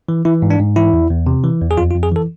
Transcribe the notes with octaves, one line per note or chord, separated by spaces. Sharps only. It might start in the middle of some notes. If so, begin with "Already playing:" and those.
E3
E3 E4
G#2
D4
G#2
E3 E4
E2
E2
C3
E3
E2
G#4
F2 F4
F4
F2
G#4
E3 A4